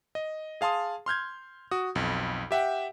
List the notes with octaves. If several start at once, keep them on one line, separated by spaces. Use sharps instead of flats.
D#5
G#4 F5 A5 C6 D#6
C6 F6 G6 G#6
F#4 D#6
B1 F2
G4 E5 F#5 G5